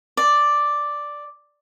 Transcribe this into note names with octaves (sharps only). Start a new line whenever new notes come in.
D5